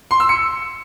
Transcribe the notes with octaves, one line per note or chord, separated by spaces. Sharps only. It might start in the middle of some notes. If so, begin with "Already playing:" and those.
C6
E6
C#7